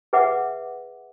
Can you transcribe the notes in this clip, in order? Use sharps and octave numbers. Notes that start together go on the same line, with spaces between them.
G#4 B4 E5 F#5 D6